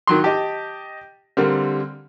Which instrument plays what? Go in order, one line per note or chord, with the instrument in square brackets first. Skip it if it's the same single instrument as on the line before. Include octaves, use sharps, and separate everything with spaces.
[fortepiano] D#3 F#3 C6
[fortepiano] G4 [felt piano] D#5 A5
[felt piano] D3 G3 C4 [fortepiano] A#3